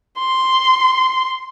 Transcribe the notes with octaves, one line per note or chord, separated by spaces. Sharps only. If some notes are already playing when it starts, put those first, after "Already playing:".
C6